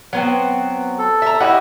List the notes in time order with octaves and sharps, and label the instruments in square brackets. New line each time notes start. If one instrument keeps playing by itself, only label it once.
[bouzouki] F#3 B3 C4
[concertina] A4
[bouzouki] E5 A#5
[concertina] E4 G4 [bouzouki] F#4 D#5